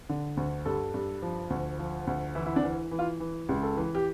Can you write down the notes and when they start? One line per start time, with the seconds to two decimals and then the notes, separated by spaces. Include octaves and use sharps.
0.09 D3
0.37 D2
0.66 G2 A4
0.94 G2
1.22 F3
1.50 D2
1.79 F3
2.07 D2
2.35 E3 E4
2.46 E4
2.56 D4
2.64 E3
2.91 E3
2.99 F4
3.20 E3
3.49 C#2
3.63 A4
3.77 E3
3.95 G4